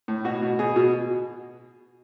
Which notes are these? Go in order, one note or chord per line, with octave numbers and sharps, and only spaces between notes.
A2
B2 F#4
B2
B2 G#4
B2